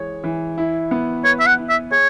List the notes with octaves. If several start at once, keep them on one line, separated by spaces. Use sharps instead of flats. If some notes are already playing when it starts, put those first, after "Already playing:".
Already playing: E3 G#3 C#5
E3
E4
B3
B4 C#5
E5
F#5
E4
E5
G#4 C#5